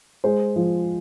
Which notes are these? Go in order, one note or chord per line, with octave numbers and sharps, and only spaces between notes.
G#3 C5
F3